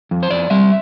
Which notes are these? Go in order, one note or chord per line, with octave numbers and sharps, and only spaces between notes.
F2
C5
F2 D5
G3 E5